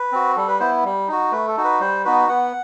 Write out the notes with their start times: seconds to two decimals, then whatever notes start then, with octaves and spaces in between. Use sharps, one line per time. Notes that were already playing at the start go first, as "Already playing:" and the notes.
Already playing: B4
0.12 C4 F#4
0.36 G3 A4
0.48 B4
0.60 B3 E4 C5
0.85 G3
1.08 D#4 F#4
1.32 A3 B4
1.48 A4
1.57 D#4 F#4
1.64 B4
1.80 G3 C5
2.05 B3 D#4 F#4 B4
2.29 B3 F#5